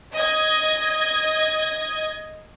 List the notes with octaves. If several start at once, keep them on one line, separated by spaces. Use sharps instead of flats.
D#5 G#6